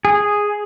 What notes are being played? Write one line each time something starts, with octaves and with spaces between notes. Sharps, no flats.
G#4